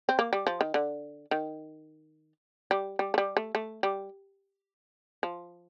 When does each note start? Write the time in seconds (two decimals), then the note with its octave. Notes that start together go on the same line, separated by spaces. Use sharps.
0.09 C4
0.19 A#3
0.33 G3
0.47 F3
0.61 D#3
0.74 D3
1.31 D#3
2.71 G3
2.99 G3
3.14 A3
3.18 G3
3.37 A3
3.55 A3
3.83 G3
5.23 F3